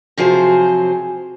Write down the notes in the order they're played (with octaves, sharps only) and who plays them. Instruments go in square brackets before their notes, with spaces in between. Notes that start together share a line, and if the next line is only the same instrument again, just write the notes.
[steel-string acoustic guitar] C3 F3 F#3 G#4 C5